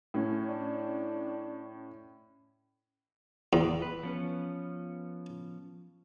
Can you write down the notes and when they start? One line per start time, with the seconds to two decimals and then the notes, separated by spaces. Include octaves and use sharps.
0.14 A2 C#4
0.49 D4
3.53 E2
3.82 B4
4.03 F3 B3 C#4